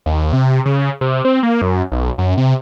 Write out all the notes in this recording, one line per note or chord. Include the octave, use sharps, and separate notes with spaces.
D#2
C3
C#3
C3
C4
A#3
F#2
B1
F#2
C3